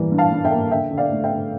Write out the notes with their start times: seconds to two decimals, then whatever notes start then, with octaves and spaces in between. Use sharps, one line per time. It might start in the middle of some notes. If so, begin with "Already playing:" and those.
Already playing: E3 G3 A#3
0.11 G2
0.18 F5 A5
0.32 G2
0.45 E5 G5
0.51 A#3
0.71 D3 E5 G5
0.91 D3
0.98 D5 F5
1.11 A3
1.24 E5 G5
1.31 D3